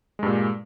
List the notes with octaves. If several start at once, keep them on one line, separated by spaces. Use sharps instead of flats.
G2 A#2 G#3